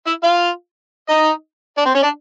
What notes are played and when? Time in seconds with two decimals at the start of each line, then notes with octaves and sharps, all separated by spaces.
0.07 E4 E5
0.23 F4 F5
1.09 D#4 D#5
1.77 D4 D5
1.86 C4 C5
1.95 C#4 C#5
2.03 D4 D5